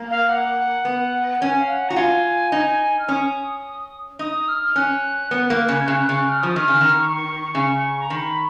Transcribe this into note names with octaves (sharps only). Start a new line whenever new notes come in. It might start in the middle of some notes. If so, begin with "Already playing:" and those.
Already playing: A#3
F5
F#5
B3
C#4 G#5
F5
F#5
F#4 A#5
F4 G#5
D#4
F6
C#4 D#6
D#4 D#6
F6
C#4 F#6
B3
A#3
C#3
G#6
C#3 F#6
C#3
F#6
F6
F3 D#6
D#3 F6
C#3
D#3
C#6
C#3
A#5
D#3 B5